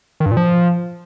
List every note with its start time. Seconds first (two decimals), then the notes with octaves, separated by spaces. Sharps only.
0.20 D#3
0.26 G2
0.31 A#2
0.37 F3